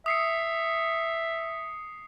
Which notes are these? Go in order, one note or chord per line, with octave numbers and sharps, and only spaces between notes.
E5 D#6 C7 C#7